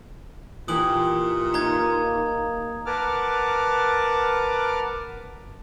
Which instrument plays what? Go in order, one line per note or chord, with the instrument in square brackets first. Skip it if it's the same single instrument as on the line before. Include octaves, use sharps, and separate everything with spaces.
[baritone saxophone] A#2 [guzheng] E3 G4 [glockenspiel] D#6 F#7
[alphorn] A#3 [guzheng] D#4 [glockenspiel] A#5 G#6
[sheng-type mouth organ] A#4 B4 F#5 A5 D6 F6